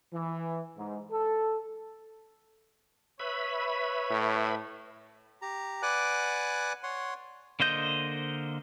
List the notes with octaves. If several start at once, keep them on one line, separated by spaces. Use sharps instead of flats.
E3
G#2
A4
B4 C#5 E5 B5
A2
G4 A#5
B4 D5 F#5 G#5 D6 F#6
C#5 F#5 C6
D3 A#3 C5 D#5 G6